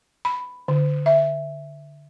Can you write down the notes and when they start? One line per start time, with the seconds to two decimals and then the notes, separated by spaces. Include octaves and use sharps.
0.25 B5
0.68 D3
1.06 E5